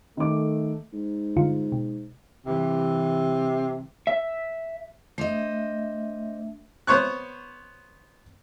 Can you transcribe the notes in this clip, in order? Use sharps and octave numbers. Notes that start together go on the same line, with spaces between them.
D#3 A3 D6
G#2
G2 D3 F4
B2
G2 C3 E3
E5
A3 D4 C5 D#5 E5
B3 C5 C#5 C#6 F#6